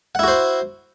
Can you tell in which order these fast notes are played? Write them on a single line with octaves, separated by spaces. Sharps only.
F#5 E4 F#4 C5